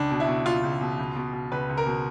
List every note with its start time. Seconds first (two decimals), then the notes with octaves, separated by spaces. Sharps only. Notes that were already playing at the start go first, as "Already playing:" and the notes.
Already playing: C#2 D4
0.11 B2
0.20 E4
0.28 B2
0.45 C#2 F4
0.63 C#2
0.81 B2
0.99 C#2
1.16 B2
1.33 B2
1.52 C#2 B4
1.69 C#2
1.78 A#4
1.86 B2